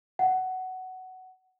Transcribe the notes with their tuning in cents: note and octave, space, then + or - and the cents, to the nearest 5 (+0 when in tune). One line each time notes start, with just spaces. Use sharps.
F#5 +15